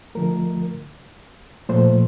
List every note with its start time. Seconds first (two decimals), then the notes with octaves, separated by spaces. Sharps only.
0.15 D3 F3 A3 A#4
1.69 A#2 F3 A3 C5